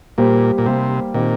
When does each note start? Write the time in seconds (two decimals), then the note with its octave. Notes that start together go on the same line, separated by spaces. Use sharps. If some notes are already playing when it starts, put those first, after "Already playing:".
0.18 A#2 G3 A#3 G4 C5
0.58 A#2
0.66 C3 G3 A#3 G4 C5
1.14 A#2 D#3 C4 G4